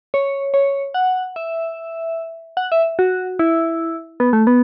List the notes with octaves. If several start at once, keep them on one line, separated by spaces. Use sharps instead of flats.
C#5
C#5
F#5
E5
F#5
E5
F#4
E4
B3
A3
B3